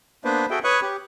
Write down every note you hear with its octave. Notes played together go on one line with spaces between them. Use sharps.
A#3 B3 D4 B4 C5
F#4 G#4 A4 E5 G5
B4 C#5 C#6 D#6 F#6
G4